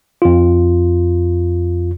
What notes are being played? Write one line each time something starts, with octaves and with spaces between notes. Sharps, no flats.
F2 F4